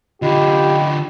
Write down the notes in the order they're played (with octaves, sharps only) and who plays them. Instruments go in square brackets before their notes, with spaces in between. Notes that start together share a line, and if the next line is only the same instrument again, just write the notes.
[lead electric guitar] D3 D#4 [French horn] F4 [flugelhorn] G4 [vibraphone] D#5 B5